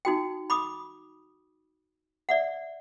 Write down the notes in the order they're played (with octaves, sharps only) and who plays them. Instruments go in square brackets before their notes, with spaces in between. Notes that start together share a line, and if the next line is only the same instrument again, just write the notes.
[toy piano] D#4 F#4 G5
B5 D6 D#6
D5 E5 F#5